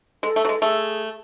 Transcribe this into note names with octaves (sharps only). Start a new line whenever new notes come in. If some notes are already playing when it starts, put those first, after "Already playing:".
G#3 A4
A3
F#3
G#3
A3 G#4